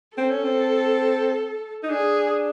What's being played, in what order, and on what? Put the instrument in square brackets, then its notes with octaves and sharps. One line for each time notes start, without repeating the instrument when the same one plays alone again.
[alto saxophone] C4 [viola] A4
[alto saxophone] C#4
C4
D#4
[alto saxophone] D4 [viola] G#4